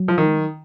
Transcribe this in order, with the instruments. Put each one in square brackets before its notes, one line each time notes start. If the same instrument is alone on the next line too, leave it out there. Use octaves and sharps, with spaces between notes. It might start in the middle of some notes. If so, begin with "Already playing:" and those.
Already playing: [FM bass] F#3
[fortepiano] F3
D#3
[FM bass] G#3
F#3